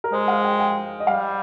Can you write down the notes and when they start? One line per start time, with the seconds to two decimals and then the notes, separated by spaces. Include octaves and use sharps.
0.04 A#4
0.12 G#3 C5
0.28 F5
0.45 G5
0.60 G5
1.00 D#5
1.07 G3 F5